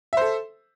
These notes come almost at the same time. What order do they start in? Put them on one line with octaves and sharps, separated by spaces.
E5 C5 A4